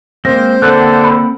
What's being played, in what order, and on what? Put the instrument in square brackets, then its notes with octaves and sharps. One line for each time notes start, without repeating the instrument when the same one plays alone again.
[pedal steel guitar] G#3 A#3 C4 [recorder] C5 [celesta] A#6
[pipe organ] D3 A4 [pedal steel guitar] A#3 C4 F#5 [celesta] F#6
[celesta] B5